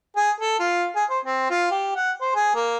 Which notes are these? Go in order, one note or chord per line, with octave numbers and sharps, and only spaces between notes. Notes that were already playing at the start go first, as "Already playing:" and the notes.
G#4
A4
F4
G#4
C5
C4
F4
G4
F#5
C5
G#4
A#3